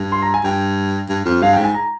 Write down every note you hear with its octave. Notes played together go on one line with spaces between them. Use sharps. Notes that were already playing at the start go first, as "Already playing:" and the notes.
Already playing: G2
C6
A#5
G#5
G2 G5
G2
F2
G2 F5
G5
G#2
G#5
A#5